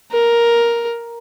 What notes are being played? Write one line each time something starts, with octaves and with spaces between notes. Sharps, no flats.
A#4